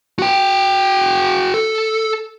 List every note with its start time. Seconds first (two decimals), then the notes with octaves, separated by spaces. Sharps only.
0.19 F#4 G5
1.54 A4